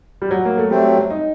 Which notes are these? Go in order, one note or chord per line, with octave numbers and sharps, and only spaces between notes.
G3
F#3
A#3
A3
F#3 G3 A3 C4
D#4